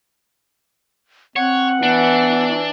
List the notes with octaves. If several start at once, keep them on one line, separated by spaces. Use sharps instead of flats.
C4 C#5 F#5
E3 B3 D4